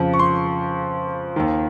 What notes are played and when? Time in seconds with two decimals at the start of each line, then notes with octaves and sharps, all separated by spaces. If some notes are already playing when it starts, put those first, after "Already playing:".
Already playing: F2 C#3 F3
0.14 C#6
0.19 C6
1.36 D#2 D#3